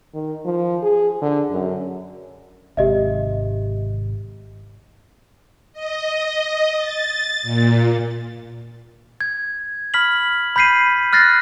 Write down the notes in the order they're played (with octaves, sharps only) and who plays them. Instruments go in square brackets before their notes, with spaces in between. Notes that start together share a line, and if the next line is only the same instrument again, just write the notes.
[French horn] D#3
F3
G#4
D3
F#2
[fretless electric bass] G#1 G#2 C3 [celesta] G4 D#5 E5
[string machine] D#5
A6
A#2
[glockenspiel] G#6
B5 F6 B6 F#7
B5 G6 B6 C7 D#7
F6 F#6 A6 A#6 C7